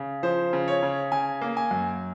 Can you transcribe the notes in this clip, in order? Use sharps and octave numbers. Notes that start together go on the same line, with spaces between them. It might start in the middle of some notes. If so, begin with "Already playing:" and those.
Already playing: C#3
F3 C5
C#3
C#5
C#3
C#3 G#5
A#3
G#5
F#2